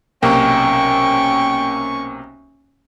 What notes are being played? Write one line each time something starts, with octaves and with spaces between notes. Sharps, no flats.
B1 C3 A#3 C#4 G5 C#6